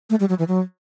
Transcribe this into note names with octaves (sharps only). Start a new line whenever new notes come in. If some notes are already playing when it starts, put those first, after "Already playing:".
A3
G3
F#3
E3
F#3